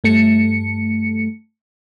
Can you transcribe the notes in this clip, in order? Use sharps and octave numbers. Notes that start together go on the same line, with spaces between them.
G2 A3 C#7